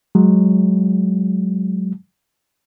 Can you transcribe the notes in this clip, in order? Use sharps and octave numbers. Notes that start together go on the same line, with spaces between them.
F#3 G#3